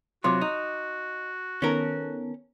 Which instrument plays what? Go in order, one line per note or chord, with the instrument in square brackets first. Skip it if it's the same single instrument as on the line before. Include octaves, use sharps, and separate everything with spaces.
[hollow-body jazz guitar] C3 F#3 F4 [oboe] F#4 [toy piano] C6 D6
[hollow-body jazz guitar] D#4
[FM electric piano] D#3 B3 A4 [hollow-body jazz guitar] C#4 A#4